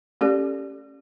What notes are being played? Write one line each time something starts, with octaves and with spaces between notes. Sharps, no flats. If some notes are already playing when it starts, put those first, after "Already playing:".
A3 C#4 G4 A4 D5